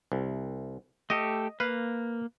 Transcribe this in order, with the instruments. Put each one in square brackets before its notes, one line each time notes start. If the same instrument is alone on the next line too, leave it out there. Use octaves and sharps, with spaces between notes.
[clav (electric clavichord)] C2
[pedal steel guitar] A3 G4 A4 [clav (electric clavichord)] D#5
[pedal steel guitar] A#3 [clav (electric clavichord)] B4 F5